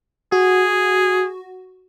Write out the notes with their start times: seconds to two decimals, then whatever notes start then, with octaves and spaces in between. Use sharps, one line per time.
0.32 F#4 G#4